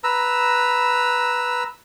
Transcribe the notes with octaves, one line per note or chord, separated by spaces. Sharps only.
B4 A#5 E6